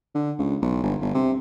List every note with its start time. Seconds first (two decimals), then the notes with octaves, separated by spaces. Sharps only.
0.15 D3
0.39 C#2
0.62 B1
0.83 G1
1.01 G1
1.15 C3